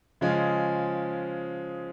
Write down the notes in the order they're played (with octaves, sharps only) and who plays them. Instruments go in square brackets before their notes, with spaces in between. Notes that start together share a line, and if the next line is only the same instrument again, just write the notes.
[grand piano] C#3 F3 G#3